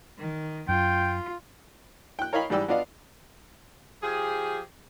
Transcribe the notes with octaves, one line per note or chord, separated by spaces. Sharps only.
D#3
F#2 F4 G5
G5 F#6
A#4 C#5 D#5 F5 G5 B5
G#2 E3 G3 D5 G5 E6
B3 D4 F4 D5 D#5 F5
F3 G4 G#4